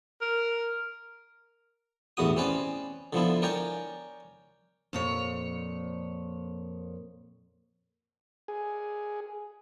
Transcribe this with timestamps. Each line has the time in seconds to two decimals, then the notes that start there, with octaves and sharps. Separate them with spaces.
0.21 A#4
2.17 A1 E2 B3 F#4 D#6
2.37 C4 C#4 B4 D5 G#5
3.13 D3 F3 B3 E4
3.42 A#4 C#5 D5 G5 G#5 A#5
4.93 F2 A#2 C#5
8.48 G#4